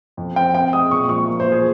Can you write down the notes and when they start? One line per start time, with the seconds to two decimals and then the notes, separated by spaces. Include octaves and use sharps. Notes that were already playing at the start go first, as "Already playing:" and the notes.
0.17 F2
0.36 C4 G5
0.54 C4 G5
0.73 G#3 D#6
0.91 A#2 C#6
1.09 F3 C#6
1.27 A#3
1.40 C5
1.46 F3
1.52 G#4